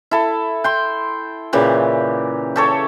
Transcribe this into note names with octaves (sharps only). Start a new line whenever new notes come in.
E4 A4
G5 C6
A#2 C#3 E3 G4
G4 A4 C#5